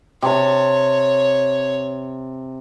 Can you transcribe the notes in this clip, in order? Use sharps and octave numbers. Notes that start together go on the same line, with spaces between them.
C3 C#5 A5